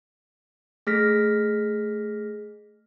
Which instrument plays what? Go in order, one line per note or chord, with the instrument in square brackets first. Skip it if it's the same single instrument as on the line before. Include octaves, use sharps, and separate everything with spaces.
[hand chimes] A3 G#4 F6 A#6 B6